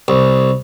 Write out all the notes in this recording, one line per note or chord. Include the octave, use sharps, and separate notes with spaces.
C2